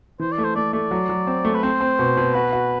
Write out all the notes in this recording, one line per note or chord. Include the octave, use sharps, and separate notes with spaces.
E3 C5
D5
A3
C5
A3 D5
A3 D5
F#3
F#3
C4
A3
B4
C4 C5
C4
B2
B2
F#4 B4
F#4